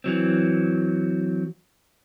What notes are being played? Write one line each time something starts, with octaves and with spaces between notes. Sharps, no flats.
E3 F#3 C4